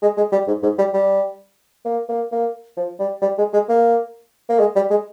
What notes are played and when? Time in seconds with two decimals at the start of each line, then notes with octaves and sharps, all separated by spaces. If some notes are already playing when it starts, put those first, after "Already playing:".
0.02 G#3
0.17 G#3
0.32 G3
0.47 G#2
0.63 G#2
0.78 G3
0.94 G3
1.85 A#3
2.09 A#3
2.32 A#3
2.77 F3
2.99 G3
3.22 G3
3.38 G#3
3.53 G#3
3.69 A#3
4.49 A#3
4.59 G#3
4.75 G3
4.90 G#3